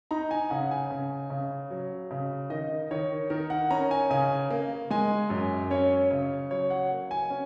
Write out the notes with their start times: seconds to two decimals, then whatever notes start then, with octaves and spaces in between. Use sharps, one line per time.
0.11 D#4 A#5
0.31 G#5
0.50 C#3 F#5
0.71 G#5
0.90 C#3
1.30 C#3
1.71 F#3
2.11 C#3
2.50 D#3 D#5
2.91 D#3 C#5
3.30 D#3 A#4
3.50 F#5
3.71 C#4 A#5
3.91 G#5
4.10 C#3 G#5
4.50 A#3
4.90 G#3 G#5
5.30 F#2
5.71 C#4 C#5
6.10 C#3 C#5
6.51 F#3 C#5
6.70 F#5
6.91 A#3
7.11 G#5
7.30 C#4